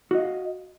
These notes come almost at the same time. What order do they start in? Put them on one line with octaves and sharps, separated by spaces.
F#4 D#5 F5